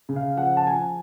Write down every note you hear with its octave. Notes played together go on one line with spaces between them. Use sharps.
C#3
F5
F3 F#5
A5
F3 G#5